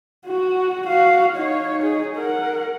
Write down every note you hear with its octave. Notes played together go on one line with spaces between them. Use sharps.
F#4
F#4 F5
D#4 C#5
D#4 G#4
A#4 F#5